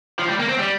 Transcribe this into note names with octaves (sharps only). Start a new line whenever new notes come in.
F3
G3
A#3
C4
G3